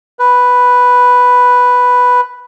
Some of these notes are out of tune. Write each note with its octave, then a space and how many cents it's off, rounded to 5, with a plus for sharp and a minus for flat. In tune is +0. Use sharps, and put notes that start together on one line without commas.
B4 +0